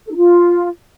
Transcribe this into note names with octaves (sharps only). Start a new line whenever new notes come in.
A4
D#4
F4